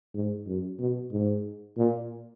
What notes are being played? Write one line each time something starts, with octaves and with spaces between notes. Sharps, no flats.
G#2
F#2
B2
G#2
A#2